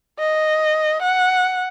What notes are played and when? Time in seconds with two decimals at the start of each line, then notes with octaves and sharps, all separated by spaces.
0.19 D#5
1.02 F#5